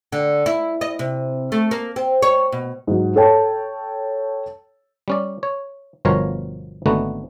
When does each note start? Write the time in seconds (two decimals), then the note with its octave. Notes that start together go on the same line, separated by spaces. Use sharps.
0.12 D3
0.46 E4
0.81 D#5
0.99 C3
1.52 A3
1.71 A#3
1.96 C4
2.22 C#5
2.52 B2
2.87 G#2 F#3
3.16 A4 C#5 G5 A5
5.08 G3 C#4 D5
5.43 C#5
6.05 G1 B2 F3 A#4 C#5 A#5
6.86 G#1 D3 A3 B3 D#4 F#4